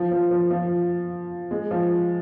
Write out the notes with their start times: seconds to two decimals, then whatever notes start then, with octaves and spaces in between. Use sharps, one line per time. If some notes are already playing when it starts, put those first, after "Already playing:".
Already playing: F3
0.11 F3
0.31 F3
0.51 F3
1.51 G#3
1.71 F3